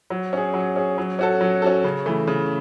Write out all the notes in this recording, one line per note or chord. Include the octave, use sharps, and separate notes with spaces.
F#3
C#4 G#4
F#3
C#4 G#4
F#3
C#4 F#4 A4
F#3
C#4 F#4 A4
C#3
E3 A3
C#3